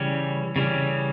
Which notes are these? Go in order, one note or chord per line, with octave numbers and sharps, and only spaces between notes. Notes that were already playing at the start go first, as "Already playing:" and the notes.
Already playing: C#3 E3 G3 C#4
C#3 E3 G3 C#4